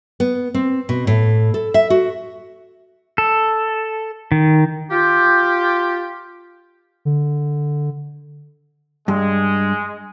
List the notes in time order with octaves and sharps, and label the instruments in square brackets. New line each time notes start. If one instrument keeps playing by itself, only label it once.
[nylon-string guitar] B3
C4
B2
A2
A4
E5
F#4
[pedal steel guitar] A4
D#3
[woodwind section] F4 G4
[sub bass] D3
[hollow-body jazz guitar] G2 [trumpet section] G#3